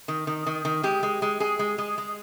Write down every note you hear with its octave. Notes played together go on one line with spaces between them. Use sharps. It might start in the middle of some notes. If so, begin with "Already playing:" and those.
D#3
D#3
D#3
D#3
G#3 G4
G#3
G#3
G#3 G#4
G#3
G#3
G#3